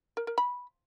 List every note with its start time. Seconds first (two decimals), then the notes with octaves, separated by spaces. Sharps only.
0.17 A#4
0.27 A#4
0.38 B5